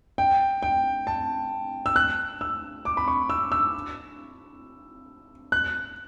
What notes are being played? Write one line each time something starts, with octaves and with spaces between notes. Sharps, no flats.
G5
G5
A5
E6
F#6
E6
D6
B5
C#6
E6
E6
F#6